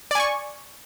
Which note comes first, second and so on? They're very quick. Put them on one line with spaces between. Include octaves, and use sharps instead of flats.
D5 G#5 C#6